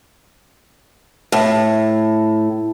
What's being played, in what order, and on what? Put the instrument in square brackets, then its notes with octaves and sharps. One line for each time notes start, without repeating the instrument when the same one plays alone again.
[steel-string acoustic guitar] A2